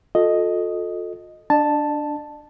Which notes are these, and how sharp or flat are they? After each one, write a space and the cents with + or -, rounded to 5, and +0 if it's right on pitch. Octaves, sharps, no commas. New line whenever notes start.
F4 +40 A4 +0 D#5 +0
D4 +0 D5 +45 A5 +0